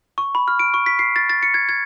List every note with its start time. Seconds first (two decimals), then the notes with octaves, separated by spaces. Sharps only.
0.18 C#6
0.35 B5
0.48 F6
0.59 D7
0.74 C#6
0.86 B6
0.99 C7
1.16 A6
1.30 A6
1.43 C#7
1.54 G#6
1.69 G#6